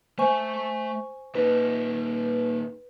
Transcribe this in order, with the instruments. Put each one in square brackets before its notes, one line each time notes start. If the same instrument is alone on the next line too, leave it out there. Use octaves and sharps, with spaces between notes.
[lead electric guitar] A3 E5 [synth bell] C5 G#5 C#6
[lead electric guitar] A#2 D#4 [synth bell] B4